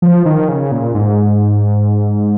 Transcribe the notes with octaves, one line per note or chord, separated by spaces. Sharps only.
F3
D#3
C#3
A#2
G#2